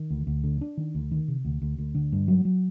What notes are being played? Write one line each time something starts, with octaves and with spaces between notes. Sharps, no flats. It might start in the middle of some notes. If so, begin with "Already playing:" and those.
Already playing: D#3
D2
D2
D3
D4
D#3
D2
D#3
C3
D2
D2
D2
D3
G2
F#3
F#3